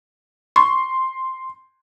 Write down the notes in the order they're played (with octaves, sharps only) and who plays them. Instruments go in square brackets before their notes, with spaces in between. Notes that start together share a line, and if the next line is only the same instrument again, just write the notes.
[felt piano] C6 [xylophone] C#6